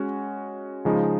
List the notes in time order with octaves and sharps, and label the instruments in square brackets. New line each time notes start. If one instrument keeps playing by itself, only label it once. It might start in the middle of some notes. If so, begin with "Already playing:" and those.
Already playing: [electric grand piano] G#3 C#4 F#4
C#3 F3 G#3 D#4